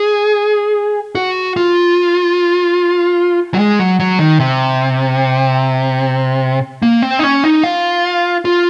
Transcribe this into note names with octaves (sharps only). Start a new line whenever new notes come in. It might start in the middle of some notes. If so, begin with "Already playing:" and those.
Already playing: G#4
F#4
F4
F#3
G#3
F#3
F#3
D#3
C3
A#3
C4
D#4
C#4
D#4
F4
F4